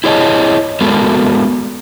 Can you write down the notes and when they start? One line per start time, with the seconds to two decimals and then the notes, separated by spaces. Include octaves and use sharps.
0.04 E4 G#4 C#5 D#5 A5
0.81 G#3 B3 F#4 A4 A#4